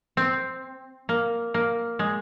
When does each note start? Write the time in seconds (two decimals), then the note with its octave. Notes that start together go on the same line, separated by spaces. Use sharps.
0.17 C4
1.09 A#3
1.54 A#3
1.99 G#3